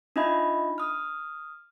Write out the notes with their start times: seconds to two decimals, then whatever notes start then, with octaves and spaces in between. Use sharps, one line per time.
0.16 D4 D#4 F4 D#5 E5 B5
0.78 D#6 F6